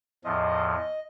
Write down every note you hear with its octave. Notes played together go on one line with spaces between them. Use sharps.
E2 A2 F3 D#5